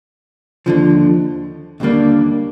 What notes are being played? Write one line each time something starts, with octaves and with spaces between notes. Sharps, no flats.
D#2 D3 F3
D#2 D3 G3 A#3 D4